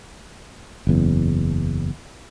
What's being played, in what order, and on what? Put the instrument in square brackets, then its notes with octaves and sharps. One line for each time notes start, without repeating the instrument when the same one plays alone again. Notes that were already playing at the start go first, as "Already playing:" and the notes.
[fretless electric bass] F#1 E2